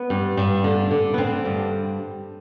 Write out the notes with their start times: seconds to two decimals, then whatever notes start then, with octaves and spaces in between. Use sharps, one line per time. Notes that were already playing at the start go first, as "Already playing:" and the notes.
Already playing: B3
0.10 G2
0.37 G2
0.64 D3
0.91 D3
1.14 B3
1.18 D3 C4
1.45 G2